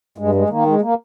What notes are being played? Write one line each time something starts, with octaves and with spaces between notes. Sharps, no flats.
G2 G#3
G#3
D#3 A#3
G#3
A#3